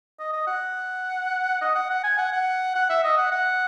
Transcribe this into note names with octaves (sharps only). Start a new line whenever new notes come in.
D#5
D#5
F#5
D#5
F#5
F#5
G#5
F#5
F#5
F#5
E5
D#5
F#5
F#5